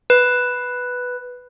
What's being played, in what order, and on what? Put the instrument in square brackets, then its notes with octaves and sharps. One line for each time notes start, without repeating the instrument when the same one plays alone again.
[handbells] B4